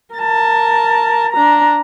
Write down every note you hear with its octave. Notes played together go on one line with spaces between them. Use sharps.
A#4 A5
D4 A#5